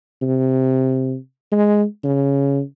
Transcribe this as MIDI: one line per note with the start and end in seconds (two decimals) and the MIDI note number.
0.22 1.16 48
1.52 1.85 56
2.04 2.61 49